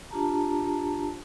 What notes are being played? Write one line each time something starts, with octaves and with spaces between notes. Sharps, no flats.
D4 F4 G4 A5 A#5